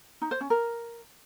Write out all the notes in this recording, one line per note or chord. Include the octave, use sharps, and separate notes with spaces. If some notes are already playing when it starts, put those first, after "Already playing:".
D#4
C5
C#4
A#4